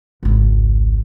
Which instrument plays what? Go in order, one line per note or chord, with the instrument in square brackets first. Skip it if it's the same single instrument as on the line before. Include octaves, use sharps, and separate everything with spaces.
[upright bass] G#1 C#2